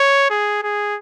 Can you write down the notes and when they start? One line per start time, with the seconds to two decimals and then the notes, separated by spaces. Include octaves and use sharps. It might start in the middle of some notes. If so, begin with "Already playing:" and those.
Already playing: C#5
0.30 G#4
0.63 G#4